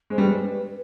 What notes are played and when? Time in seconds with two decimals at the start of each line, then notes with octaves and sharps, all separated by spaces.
0.10 G#3 C5
0.18 G3 B4